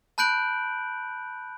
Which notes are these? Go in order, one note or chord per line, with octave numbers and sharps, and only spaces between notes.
A5 B5 F#6 G6 D7 F#7